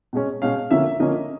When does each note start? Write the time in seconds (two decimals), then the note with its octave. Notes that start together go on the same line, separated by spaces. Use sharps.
0.13 B2 G#3 C#4
0.42 B2 G#3 C#4 F5
0.71 D3 F3 A#3 C#4 E5
1.00 D3 F3 A#3 C#4 D#5